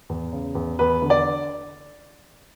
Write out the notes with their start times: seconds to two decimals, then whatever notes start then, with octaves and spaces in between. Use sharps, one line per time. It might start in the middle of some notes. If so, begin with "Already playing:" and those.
0.09 E2
0.33 C#3
0.55 E2
0.79 E2 B4
1.02 D3
1.10 D5